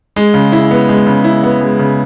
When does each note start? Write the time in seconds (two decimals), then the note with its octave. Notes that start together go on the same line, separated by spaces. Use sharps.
0.16 G#3
0.34 C#3
0.52 E4
0.71 B3
0.89 G#3
1.06 C#3
1.24 E4
1.43 B3
1.61 G#3
1.79 C#3